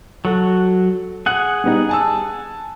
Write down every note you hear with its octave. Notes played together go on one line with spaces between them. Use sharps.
F#3 F#4 A4
G#4 F#5 F#6
G3 B3 D#4
G#5 A5 E6